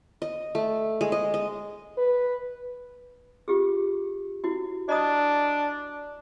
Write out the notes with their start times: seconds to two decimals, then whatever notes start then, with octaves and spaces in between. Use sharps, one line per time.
0.22 D#5
0.55 A3
1.01 G#3
1.12 D#5
1.34 D#5
1.97 B4
3.48 F4 G4 G#4
4.44 E4 F#4
4.89 D4 D#5 A#5 D#6